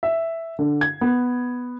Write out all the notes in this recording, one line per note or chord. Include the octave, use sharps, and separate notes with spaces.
E5
D3
G#6
B3